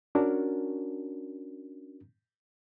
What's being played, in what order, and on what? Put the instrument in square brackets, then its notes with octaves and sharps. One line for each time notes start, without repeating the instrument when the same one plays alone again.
[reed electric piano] C#4 D4 F#4 A#4